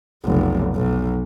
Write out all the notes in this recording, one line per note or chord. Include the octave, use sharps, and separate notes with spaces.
F1 B1
B1